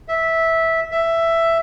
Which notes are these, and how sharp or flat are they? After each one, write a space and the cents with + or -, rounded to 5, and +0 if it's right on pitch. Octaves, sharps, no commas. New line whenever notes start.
E5 -10
E5 +10